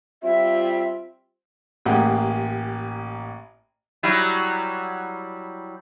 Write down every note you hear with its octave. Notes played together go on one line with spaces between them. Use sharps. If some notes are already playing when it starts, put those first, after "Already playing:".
G3 C4 F4 E5
A1 A#3 G4 G#4 F#5 G5
F#3 G3 E4